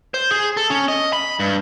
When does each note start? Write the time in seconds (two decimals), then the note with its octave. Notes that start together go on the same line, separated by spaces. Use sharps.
0.14 C5
0.31 G#4
0.57 A4
0.70 C#4
0.88 D#5
1.13 B5
1.40 G2